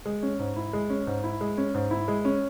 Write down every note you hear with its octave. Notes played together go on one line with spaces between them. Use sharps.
G#3
C#4
G#2
E4
G#3
C#4
G#2
E4
G#3
C#4
G#2
E4
G#3
C#4